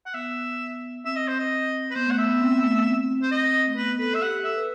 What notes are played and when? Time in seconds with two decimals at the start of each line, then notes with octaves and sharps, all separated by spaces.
0.06 F#5
0.14 B3 E5
1.05 C4 E5
1.16 D#5
1.28 C5
1.39 D#5
1.90 B4
1.95 B3 C5
2.07 A3 F#5
2.18 B3 E5
2.29 B3
2.41 C4
2.52 B3
2.63 A3
2.74 B3
2.86 C4
3.22 C5
3.31 D#5
3.67 A3
3.77 B3 B4
3.87 B3
3.99 A4 B4
4.10 A4 E5
4.22 G4 F#5
4.33 G4
4.44 A4 E5
4.56 B4